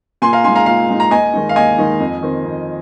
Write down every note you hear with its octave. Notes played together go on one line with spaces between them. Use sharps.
A#2 G#5 C6
F5 A#5
G#3 D#4 G#5 C6
F5 A#5
A#2 F5
G#3 D#4
A#5
D#2 D#5 G#5
D#3 G#3 D#4
F5
D#2 D#5 G#5
D#3 G#3 D#4
F2
D#3 C4
F2